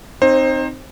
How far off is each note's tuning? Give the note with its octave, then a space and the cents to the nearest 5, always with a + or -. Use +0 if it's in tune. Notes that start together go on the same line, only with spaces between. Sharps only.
C4 +0 D#4 -15 C5 +25